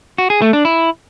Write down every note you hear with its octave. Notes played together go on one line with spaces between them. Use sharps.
F#4
G#4
A3
D4
E4